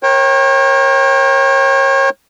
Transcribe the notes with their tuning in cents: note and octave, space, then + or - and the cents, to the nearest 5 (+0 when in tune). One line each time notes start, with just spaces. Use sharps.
A#4 +20 C#5 -35 G5 +0